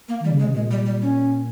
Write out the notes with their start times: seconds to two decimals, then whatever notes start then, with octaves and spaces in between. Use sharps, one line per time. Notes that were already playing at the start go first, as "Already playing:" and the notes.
0.09 A#3
0.20 D#3 G3
0.31 C#3
0.39 G#3
0.43 C3
0.55 A#2 G#3
0.71 G3
0.86 G3
1.02 C#4